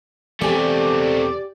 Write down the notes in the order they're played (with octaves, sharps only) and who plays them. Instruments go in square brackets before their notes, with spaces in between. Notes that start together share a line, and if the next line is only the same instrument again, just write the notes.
[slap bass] E1 E3 B3 [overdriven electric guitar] A3 C4 [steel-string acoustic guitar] G4 G#5 [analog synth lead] D5